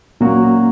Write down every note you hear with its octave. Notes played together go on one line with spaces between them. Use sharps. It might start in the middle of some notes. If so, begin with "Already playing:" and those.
A#2 F#3 A#3 C#4 F#4